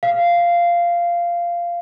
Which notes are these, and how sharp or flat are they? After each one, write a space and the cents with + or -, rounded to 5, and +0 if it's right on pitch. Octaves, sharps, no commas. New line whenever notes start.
F5 -10